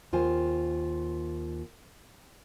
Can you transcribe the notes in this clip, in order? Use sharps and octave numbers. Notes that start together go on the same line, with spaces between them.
D#2 F4 C5 G#5